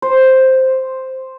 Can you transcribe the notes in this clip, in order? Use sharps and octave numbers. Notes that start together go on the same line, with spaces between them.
C5